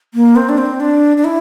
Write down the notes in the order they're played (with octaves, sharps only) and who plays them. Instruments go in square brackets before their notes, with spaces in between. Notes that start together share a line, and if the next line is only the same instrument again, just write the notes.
[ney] A#3
C4
D4
C4
D4
D4
E4